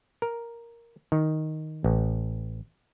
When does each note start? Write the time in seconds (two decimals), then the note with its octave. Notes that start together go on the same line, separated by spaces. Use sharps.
0.22 A#4
1.12 D#3
1.84 A1